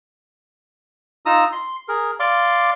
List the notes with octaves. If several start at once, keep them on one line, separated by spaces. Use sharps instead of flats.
D#4 F4 A#5 D#6 E6
C6
G#4 A#4
D5 F5 C6 D6